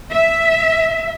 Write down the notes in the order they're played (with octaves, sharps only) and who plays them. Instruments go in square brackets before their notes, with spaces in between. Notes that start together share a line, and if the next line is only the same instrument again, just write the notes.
[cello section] E5